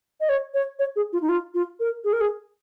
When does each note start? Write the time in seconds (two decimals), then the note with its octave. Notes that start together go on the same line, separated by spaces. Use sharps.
0.21 D#5
0.29 C#5
0.54 C#5
0.79 C#5
0.96 G#4
1.13 F4
1.22 D#4
1.29 F4
1.54 F4
1.80 A#4
2.04 G#4
2.13 A#4
2.21 G#4